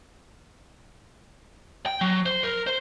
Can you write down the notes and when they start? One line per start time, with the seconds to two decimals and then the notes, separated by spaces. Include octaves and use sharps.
1.86 G5
2.01 F#3
2.26 C5
2.44 A#4
2.67 C5